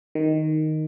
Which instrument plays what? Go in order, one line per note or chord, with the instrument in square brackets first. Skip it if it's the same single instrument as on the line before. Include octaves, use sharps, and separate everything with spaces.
[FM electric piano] D#3